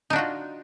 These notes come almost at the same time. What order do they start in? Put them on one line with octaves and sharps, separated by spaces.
D#4 D4 F#4 F4